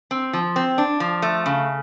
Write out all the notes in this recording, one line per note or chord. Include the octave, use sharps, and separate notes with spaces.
C4
F3
C4
D4
F3
A3
C#3